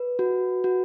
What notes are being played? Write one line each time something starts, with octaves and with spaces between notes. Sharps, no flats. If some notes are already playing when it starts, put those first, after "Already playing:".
Already playing: B4
F#4
F#4